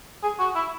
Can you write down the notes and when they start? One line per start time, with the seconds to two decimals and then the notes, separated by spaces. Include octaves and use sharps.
0.23 G#4
0.39 F#4
0.55 E4